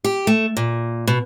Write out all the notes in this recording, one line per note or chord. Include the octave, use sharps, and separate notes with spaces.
G4
A3
A#2
B2